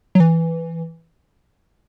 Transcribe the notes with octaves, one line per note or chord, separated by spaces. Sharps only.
F#3
E3